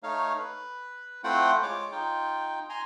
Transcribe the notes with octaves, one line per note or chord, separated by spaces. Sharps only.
A3 D#4 C#5 F5
B4
A3 C4 E4 F4 F#5 G5
G#3 F4 C#5 D6
D#4 F4 G5
G#5 A#5 C6